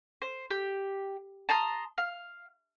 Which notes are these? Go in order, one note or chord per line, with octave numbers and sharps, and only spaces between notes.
C5
G4
A5 A#5 C6 D#6
F5